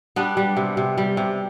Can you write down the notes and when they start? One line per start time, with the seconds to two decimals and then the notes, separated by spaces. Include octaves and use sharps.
0.16 G3 B3 D4
0.37 G3
0.57 C3
0.77 C3
0.98 G3
1.17 C3